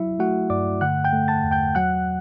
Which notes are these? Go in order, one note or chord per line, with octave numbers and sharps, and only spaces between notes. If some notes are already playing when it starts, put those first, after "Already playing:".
Already playing: F#3 E4 E5
A3 F#4 F#5
G2 D5 D6
D3 F#5 F#6
G5 G6
A3
A5 A6
E2
G5 G6
F#3 F#5 F#6